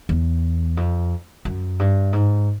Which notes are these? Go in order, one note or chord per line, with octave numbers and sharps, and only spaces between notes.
E2
F2
F#2
G2
G#2